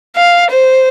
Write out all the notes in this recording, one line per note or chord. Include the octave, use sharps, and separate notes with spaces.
F5
C5